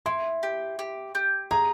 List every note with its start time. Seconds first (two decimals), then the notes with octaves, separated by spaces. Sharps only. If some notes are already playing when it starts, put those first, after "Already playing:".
0.06 E4 C6
0.43 G4
0.79 G4
1.15 G4
1.51 G#4 A#5